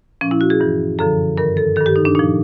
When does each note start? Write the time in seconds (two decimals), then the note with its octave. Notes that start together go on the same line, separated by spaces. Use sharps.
0.21 A#2 F3 C#4
0.31 E4
0.41 F#4
0.50 G#4
0.60 G2 E3
0.99 F#2 D3 F3 A4
1.38 G2 D#3 A#4
1.57 A4
1.76 G2 D#3 A4
1.86 G4
1.96 D#4
2.05 D4
2.15 A#2 F3 D#4